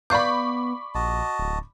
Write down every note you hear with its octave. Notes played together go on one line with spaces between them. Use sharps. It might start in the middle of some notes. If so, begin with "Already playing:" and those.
B3 D5 F5 B5 C#6 D6 G6
A#1 F#4 D#5 A5
D1